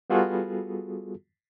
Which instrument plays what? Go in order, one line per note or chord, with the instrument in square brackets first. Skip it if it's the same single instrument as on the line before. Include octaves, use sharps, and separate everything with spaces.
[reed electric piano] G3 B3 F4 F#4 G#4 A4